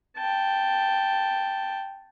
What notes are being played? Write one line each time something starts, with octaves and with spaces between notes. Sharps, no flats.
G5 A5